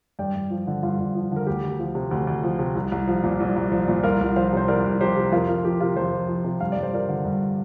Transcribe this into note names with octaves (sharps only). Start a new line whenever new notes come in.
G2 D5 G5
G2
F3
D3
G2 F4
G2
F3
D3 A#4
D2 G4
D2
F3
C3
D2
D2
F3
C3
C2
C2
F3
A#2
C2
C2
F3
A#2
C2 F4 A#4
C2
F3 C5 F5
C3 C5
C2 A#4 D5
C2
F3 G4 C5
C3
F2 F4 A#4
F2 F4 A#4
F3 G4
C3 F4 A#4
F2 G4 C5
F2
F3
C3
G2 F5
G2 D5
C5
F3 A#4 D5
D3
G2